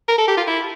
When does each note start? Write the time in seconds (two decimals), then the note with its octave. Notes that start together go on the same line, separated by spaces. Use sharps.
0.08 A#4
0.18 A4
0.28 G4
0.37 F4
0.47 E4